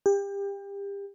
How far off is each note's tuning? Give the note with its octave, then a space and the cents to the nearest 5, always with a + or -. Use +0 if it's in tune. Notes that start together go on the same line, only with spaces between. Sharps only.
G4 +30